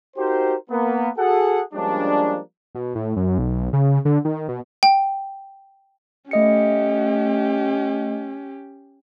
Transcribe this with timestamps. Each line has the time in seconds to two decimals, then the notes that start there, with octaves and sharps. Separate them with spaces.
0.17 D#4 F#4 G4 A#4 C5
0.70 A#3 B3
1.18 F#4 G#4 A4 F#5
1.74 F3 G3 G#3 A#3 C#4 D4
2.75 B2
2.95 A2
3.16 F#2
3.38 B1
3.73 C#3
4.05 D3
4.25 D#3
4.48 B2
4.83 G5
6.31 A3 C#4 G4 D#5 C#7